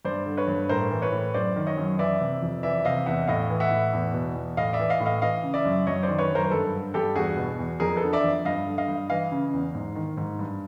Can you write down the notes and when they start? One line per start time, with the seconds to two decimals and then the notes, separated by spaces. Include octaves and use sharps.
0.05 G2 C5 D5
0.26 D3
0.37 B4 C#5
0.48 G2
0.69 A2 A#4 C5
0.91 E3
1.02 B4 C#5
1.12 A2
1.34 F#2 C5 D5
1.56 D#3
1.67 C#5 D#5
1.77 F#2
1.99 E3 D5 E5
2.20 C3
2.42 F2
2.63 E3 D5 E5
2.85 C3 D#5 F5
3.06 E2 E5 F#5
3.28 A2 D#5 F5
3.50 E3
3.60 E5 F#5
3.71 A2
3.93 E2
4.14 B2
4.35 E2
4.57 A2 D#5 F5
4.73 D5 E5
4.79 E3
4.89 D#5 F5
5.00 A2
5.06 D#5 F5
5.22 E3 D#5 F5
5.43 C#3
5.54 D5 E5
5.65 F#2
5.87 F#2 C#5 D#5
6.03 C5 D5
6.08 D#3
6.19 B4 C#5
6.30 F#2 A#4 C5
6.44 C5
6.51 G2 A4 B4
6.72 D3
6.94 G2 G4 A4
7.16 E2 F#4 G#4
7.37 B2
7.59 E2
7.80 F2 G#4 A#4
7.96 A4 B4
8.03 D3
8.13 D5 E5
8.24 F2
8.45 G2 D#5 F5
8.67 D3
8.78 D#5 F5
8.88 G2
9.09 E3 D#5 F5
9.32 C#3
9.53 E2
9.74 G#2
9.95 D#3
10.17 G#2
10.39 G2